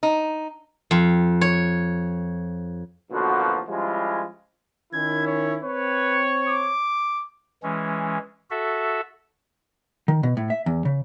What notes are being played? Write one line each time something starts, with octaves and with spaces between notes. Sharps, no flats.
D#4
F2
C#5
A1 B2 D3 F3 A#3 F#4
F3 G3 G#3 C#4 E4 F4
D#3 C#4 E4 G#6
C#5
C4 B4 C#5
D6
E3 G#3 C#4
F#4 A4 E5
D#3
B2
A2
E5
E2
C#3